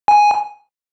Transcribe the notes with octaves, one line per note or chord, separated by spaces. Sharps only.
G#5